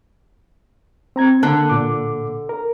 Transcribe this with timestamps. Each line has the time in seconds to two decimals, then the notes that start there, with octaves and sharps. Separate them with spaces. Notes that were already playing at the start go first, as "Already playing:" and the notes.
1.16 C4 A#5 G#6
1.43 D3 A#3 A5 F#6
1.69 A#2 D6
2.49 A#4